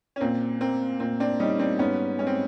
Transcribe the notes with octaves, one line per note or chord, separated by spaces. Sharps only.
C#4
A#2 C4
A#3 C4
A#2 C4
C4 D4
G3 C#4 D#4
C4 D4
G#2 B3 C#4
G#3 C#4
C4